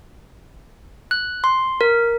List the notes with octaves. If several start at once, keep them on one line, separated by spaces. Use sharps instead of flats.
F#6
C6
A#4